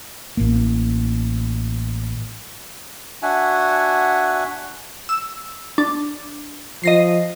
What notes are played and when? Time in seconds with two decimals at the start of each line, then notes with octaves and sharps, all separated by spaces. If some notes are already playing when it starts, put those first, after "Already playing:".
0.37 A1 A#3
3.22 D4 F#4 E5 F#5 G#5
5.09 E6
5.78 D4
6.84 F3 D#5 A#6 C7